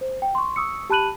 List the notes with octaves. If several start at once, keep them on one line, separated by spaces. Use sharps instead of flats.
C5
G5
C6 C#6
C#6 D#6 E6 C#7
G4 A5 B5 F#6 D#7 F#7